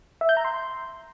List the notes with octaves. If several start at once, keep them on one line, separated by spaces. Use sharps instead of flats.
E5
G6
A#5
C6